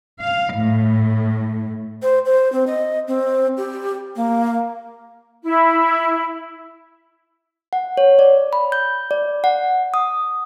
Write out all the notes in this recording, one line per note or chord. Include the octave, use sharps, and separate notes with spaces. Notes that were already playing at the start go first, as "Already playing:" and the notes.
F5
A2
C5
C5
C4
D#5
C4
G4
A#3
E4
F#5
C#5
D5
B5
G6
D5
F#5
D#6